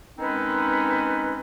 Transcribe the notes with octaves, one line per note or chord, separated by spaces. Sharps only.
D#3 G#3 C4 C#4 D#4 B4